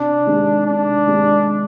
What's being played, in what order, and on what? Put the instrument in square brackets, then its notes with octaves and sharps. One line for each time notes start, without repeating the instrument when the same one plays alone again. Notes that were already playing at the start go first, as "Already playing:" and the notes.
Already playing: [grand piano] C3 [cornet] D4
[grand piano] D#3 G#3 C4 D#4
[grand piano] C3 [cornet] D4
[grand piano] D#3 G#3 C4 D#4